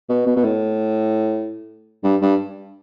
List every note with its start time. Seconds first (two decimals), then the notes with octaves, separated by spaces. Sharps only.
0.09 B2
0.26 B2
0.37 B2
0.44 A2
2.04 G2
2.22 G2